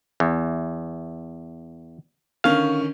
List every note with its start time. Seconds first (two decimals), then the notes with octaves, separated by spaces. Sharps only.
0.20 E2
2.44 D3 D#3 C#4 F5